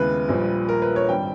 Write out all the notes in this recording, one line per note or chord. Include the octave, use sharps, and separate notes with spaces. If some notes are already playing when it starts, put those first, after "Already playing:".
Already playing: D#2 C#3 G#3 B3 E4 B4
A#1 A#2 G3
A#4
B4
C#5
G#1 G2 G3 G5